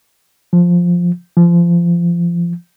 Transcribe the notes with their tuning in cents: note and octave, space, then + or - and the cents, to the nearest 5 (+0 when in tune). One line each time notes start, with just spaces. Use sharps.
F3 +5
F3 -25